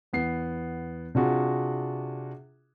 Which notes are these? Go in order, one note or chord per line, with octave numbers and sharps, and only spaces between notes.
E2 B3 C7
C3 D4 F4 F#4 G#4